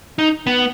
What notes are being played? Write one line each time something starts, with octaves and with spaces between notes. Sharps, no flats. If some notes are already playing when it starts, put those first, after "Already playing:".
D#4
B3